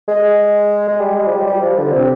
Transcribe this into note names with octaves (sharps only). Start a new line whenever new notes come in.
G#3
G#3
G3
G#3
F3
G3
G3
F3
D3
C3